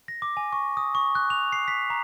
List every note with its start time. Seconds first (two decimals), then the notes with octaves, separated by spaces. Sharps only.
0.08 A#6
0.22 D6
0.37 G#5
0.53 C#6
0.77 D#6
0.95 C#6
1.15 F#6
1.30 F7
1.52 C7
1.68 B6
1.90 A#5